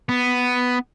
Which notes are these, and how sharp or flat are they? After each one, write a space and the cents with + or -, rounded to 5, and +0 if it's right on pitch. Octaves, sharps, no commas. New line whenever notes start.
B3 +5